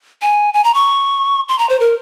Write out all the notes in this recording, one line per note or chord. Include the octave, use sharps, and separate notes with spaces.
G#5
G#5
A#5
C#6
C6
A#5
C5
A#4